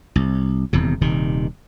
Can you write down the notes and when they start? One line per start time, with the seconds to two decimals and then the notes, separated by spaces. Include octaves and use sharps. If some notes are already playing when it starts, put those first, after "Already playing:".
0.16 C2
0.73 D#1 E2 C3
1.01 D#1 C3 D#3